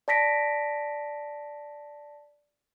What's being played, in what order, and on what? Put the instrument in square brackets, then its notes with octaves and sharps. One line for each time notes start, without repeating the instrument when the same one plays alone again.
[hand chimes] D5 A5 A#6 B6 D7